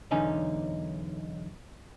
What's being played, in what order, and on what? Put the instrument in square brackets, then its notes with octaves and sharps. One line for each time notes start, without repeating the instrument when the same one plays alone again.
[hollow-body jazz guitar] B1 E2 D3 C#4 D#4 G#5